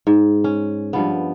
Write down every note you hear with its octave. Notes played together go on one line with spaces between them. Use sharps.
G#2
C#4
G2 F3 B3